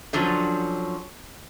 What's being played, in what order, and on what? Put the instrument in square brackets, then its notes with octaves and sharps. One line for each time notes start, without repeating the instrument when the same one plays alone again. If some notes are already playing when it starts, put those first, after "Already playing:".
[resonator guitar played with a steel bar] D3 F3 F#3 C#4